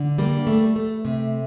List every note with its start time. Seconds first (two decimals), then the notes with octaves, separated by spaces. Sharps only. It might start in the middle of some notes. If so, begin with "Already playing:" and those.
Already playing: D3
0.18 G3 A#3
0.47 A3
0.76 A3
1.05 C3